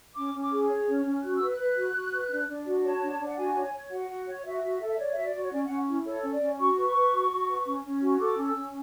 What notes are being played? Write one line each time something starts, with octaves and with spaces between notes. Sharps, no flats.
C#4 D6
C#4
D6
G#4
C#5
C#4
C#4
F#4 F#6
B4 E6
F#6
B4
F#4
F#4
B4
D4
D4
F#4
C#5 A5
D4
D4
F#5
F#4 G#5
C#5
C#5
F#4 F#5
F#4
C#5
F#4 E5
F#4
A4
E5
C#5 D5
F#4 E5
D5
F#4
C#5
C#4 D5
C#4 F#5
E4
A4 C#5
C#4
D5
C#4
F#4 C#6
B4
B4
F#4
F#4
B4
C#4
C#4
F#4
A4 D6
C#4
E6
C#4